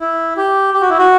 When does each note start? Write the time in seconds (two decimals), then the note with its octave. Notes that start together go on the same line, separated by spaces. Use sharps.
0.01 E4
0.37 G4
0.74 G4
0.82 F#4
0.90 E4
0.98 F#4